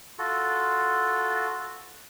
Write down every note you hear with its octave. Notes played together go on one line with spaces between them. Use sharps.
F4 F#4 A4